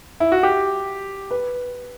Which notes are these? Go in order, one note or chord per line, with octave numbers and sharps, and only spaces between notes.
E4
F#4
G4
B4